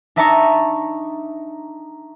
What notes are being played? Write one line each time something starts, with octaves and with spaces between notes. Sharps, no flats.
D4 D#4 E5 A5 A#5 C#6